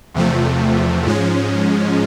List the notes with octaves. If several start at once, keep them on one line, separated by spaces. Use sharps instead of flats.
E2 C3 F3 A3
G#2 F3 G#3 C#4